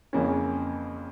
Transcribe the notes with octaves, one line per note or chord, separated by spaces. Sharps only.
F2 C#3 E3 A#3 C#4